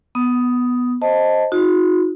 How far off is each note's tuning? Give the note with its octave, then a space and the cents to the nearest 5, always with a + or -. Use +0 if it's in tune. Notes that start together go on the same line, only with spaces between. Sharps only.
B3 +0 D#6 +0
C5 +10 D#5 +5 A5 +0
D#4 +20 F#4 -35